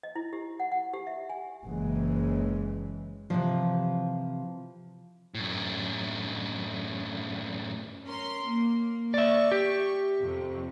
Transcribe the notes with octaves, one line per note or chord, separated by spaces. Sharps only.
D#5
E4
G4
F#5
F#5
G4
E5
G#5
F#1 C#3 E3 G#3
C3 E3 F3
F#2 A2
C#4 A#4 C6
A#3
D5 E5 C#6
G4
F2 C3